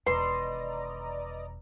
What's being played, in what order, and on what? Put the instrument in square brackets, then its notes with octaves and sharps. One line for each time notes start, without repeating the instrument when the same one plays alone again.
[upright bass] E1 D#3 [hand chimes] B4 [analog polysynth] D5 D#5 A#5 [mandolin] C6